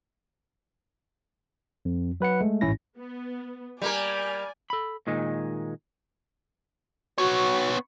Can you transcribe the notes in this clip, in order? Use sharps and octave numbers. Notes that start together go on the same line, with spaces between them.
F2
F#3 B4 F#5 C#7
G#3 A3
A1 G#2 C#4 E4 A#6
B3
G3 A#3 A#4 D5 G#5
A4 B5
A#2 D#3 G#3 D#4
B3 F#4 C#5